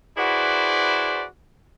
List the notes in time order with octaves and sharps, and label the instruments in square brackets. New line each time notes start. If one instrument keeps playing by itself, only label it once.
[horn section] E4 F#4 G#4 B4 C5 D5